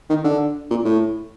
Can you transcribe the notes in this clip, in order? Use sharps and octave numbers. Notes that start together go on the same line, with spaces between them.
D#3
D3
A#2
A2